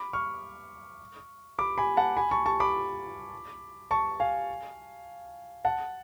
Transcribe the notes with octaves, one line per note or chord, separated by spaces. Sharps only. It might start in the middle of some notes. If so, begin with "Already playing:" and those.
Already playing: B5 D6
C#6 F6
B5 D6
G#5 B5
F#5 A5
G#5 B5
A5 C#6
A5 C#6
B5 D6
A5 C#6
F5 G#5
F#5 A5